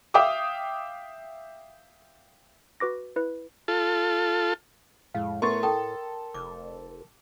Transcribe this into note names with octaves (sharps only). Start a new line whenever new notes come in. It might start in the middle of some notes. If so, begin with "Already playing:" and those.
E5 F5 G5 D6 D#6
F#4 B4 D6 A#6
E4 B4
F4 A4
F2 A2 G#3 F5
A3 B3 A#4 C6 C#6 A6
A4 G5 D#6
F1 D6